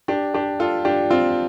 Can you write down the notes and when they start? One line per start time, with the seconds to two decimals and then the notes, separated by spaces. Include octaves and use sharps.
0.08 D4 G4
0.34 D4 G4
0.60 F4 A4
0.85 D4 G4
1.10 C4 F4